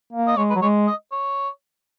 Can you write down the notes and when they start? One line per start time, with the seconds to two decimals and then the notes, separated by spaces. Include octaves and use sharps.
0.13 A#3
0.28 D#5
0.37 G#3 C#5
0.50 B4
0.56 F#3
0.62 G#3 C#5
0.87 D#5
1.12 C#5